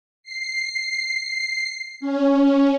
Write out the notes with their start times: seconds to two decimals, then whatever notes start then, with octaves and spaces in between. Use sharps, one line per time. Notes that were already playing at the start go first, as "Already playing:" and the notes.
0.23 C7
2.00 C#4